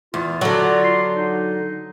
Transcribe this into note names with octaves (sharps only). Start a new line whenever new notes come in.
E2 F4
D3 F#3
C6
D#4